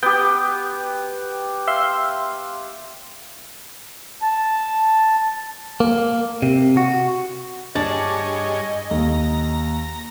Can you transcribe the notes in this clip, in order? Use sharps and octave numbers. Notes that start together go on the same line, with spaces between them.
B3 G4 G5
E5 F5 C6
A5
A#3
C3
F#4
G2 D4 G#4 C#5 D#5 A6
D#2 A#5